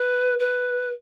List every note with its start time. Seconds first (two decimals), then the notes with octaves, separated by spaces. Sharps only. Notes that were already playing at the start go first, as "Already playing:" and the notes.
Already playing: B4
0.39 B4